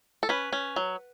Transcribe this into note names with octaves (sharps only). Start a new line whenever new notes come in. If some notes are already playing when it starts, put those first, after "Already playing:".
A4
C#4 B4
C#4
F#3